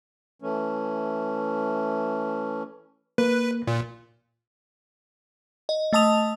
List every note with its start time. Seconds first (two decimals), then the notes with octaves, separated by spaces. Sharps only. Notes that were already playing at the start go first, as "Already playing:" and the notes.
0.42 E3 A3 C#4
3.18 A#3 B4
3.67 A#2
5.69 D#5
5.93 A3 D#5 A5 D#6 F7